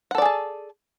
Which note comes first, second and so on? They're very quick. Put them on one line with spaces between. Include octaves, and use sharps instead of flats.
F#5 A4 D5 G#4 A5